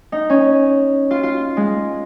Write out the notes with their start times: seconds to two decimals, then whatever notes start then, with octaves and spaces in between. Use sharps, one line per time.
0.12 D#4
0.30 C#4
1.11 F4
1.23 F4
1.57 G#3